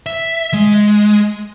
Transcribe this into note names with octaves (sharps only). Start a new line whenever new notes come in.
E5
G#3